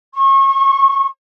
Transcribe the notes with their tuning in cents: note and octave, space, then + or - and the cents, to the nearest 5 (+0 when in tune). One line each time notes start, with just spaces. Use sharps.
C#6 -35